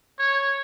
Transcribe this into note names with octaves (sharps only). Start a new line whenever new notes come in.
C#5